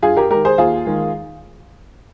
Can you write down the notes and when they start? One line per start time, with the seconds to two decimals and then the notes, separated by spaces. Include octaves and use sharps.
0.02 G2 F4 G#4
0.17 G4 A#4
0.30 D#3 G#3 G4 A#4
0.45 G#4 C5
0.58 D#2 F4 G#4
0.87 D#3 G#3